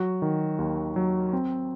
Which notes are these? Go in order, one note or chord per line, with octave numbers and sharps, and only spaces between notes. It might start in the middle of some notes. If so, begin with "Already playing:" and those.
Already playing: F#3 F#4
D#3
D#2
F#3
C4